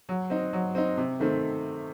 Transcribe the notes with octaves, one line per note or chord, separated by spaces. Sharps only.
F#3
C4 D#4
F#3
C4 D#4
C3
D#3 A3 C4